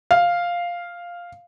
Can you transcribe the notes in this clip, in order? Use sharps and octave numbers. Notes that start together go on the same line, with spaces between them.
F5